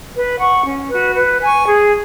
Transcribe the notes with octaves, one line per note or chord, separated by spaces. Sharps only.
B4
F#5 C#6
C#4
F#4 B4
B4
G#5 C#6
G#4